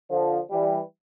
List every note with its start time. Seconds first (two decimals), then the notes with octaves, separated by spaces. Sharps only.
0.09 D3 F3
0.50 E3 G3